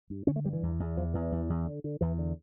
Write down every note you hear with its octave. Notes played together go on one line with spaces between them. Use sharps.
G2
D3 C#4
A3
G2 G3
E3
E2
E2
E2 F3
E2 E3
E2
E2
D3
D3
E2 E3
D3